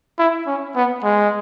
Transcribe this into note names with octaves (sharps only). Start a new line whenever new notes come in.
E4
C#4
B3
G#3